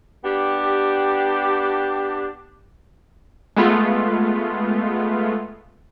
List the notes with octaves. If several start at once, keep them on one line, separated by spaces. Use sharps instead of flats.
B3 D4 G4
G#3 A3 B3 F4